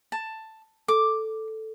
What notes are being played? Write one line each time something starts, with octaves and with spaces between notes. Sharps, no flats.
A5
A4 D6